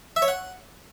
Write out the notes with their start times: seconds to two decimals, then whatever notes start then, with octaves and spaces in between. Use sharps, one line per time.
0.16 E5
0.22 C#5
0.28 F#5